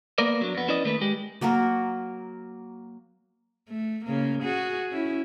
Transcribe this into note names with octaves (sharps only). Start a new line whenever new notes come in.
A#3 B3 A#4 D5
F#3 D4
F2 B3
C#4 E4 B4 D5 D#5
D#3 A3 A#3 B4
G#3 G4
F#3 A#3 F#4 A#4
A3
C#3 A#3
F#4 G#4
C#4 E4